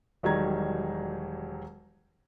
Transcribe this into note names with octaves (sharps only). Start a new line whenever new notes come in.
E1 D#3 F#3 G3 A#5 G#6